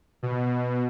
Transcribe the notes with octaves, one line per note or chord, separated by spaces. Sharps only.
B2